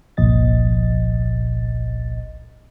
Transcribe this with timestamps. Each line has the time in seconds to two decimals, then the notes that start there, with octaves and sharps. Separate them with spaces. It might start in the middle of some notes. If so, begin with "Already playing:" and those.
0.17 G1 C2 A#2 F3 D#5 A6